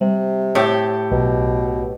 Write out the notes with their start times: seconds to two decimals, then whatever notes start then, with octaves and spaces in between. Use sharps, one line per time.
0.01 C3 G3
0.55 A2 G4 C#5 E5
1.12 B1 B2